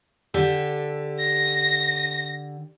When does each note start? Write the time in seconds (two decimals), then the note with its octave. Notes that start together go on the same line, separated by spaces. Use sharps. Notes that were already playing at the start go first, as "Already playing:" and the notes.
0.34 D3 G4 A4
1.19 A#6